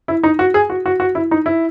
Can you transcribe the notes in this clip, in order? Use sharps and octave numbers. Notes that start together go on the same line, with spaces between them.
E4
D#4
F#4
G#4
F#4
F#4
F#4
E4
D#4
E4